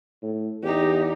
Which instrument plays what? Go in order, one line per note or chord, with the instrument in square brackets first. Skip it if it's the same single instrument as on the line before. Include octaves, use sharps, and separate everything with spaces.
[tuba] A2
[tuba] E2 [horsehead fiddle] D#4 G4